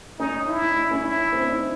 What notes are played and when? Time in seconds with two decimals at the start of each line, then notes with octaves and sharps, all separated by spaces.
0.19 C#4 D#4
0.47 D#4 E4
0.62 D#4
0.76 D4
0.91 C#4
1.04 E4
1.33 C4
1.43 D4
1.52 D#4